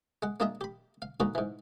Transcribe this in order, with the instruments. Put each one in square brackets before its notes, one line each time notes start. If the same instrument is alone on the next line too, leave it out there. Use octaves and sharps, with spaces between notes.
[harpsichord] G#3 F#5
A#3 D4 F4 G#4 D#5 E5
G4 B5
F5
D3 G#3 A#3 D#4 F#4 B4
G#2 E3